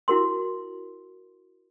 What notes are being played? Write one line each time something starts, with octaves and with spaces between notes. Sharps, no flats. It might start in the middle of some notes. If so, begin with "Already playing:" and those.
E4 F#4 A#4 C6